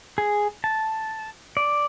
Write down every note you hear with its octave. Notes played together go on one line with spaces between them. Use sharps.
G#4
A5
D5